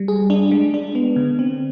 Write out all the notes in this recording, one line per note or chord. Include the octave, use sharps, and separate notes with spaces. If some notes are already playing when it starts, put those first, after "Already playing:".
Already playing: G3
G#4
D4
G#3
D4
B3
D3
C4